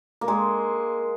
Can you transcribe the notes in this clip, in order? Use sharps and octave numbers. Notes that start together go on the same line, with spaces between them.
A#3
G#3